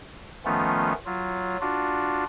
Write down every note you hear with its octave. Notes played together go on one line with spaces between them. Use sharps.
D#3 F3 A3 B3 C#4 F4
F#3 F4
D4 F4 F#4